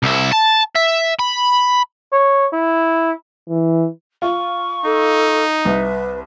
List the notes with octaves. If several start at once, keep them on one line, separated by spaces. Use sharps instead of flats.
C2 E4
A5
E5
B5
C#5
E4
E3
F4 C#6
D#4 A4
C2 B4 E5